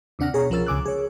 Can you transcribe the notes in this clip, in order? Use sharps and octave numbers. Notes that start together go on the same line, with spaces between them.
D#2 C3 D4 F#5 F6 A#6
B2 G#4 C#5 A#5
C2 F3 C#4 A#4 E6 A6
C#2 C#3 G#5 D6 E6 F#6
G#4 C#5